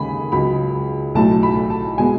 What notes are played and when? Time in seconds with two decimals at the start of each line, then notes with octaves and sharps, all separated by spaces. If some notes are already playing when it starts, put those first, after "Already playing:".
Already playing: D#2 C#3 G#3 G#5 B5
0.32 C#2 C#3 F#3 B5
1.15 B1 A2 F#3 A3 A5
1.43 B5
1.70 A5
1.98 B2 G#3 B3 G#5